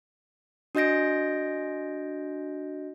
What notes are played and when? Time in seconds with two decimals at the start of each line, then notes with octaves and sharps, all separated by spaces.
0.75 D4 F#4 D#5 G6 A#6 D7